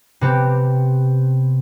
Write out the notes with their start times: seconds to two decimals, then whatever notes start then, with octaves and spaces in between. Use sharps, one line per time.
0.21 C3 B3 C4 G4